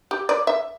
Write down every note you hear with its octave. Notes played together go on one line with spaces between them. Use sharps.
G4
D5
E5